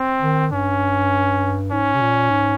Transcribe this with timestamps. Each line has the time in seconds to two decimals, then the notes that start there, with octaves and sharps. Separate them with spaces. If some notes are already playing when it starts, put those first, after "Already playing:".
Already playing: C4
0.22 D#3
0.52 G2 C#4
1.71 G#2 C#4
1.94 C3
2.01 A#2
2.30 G#2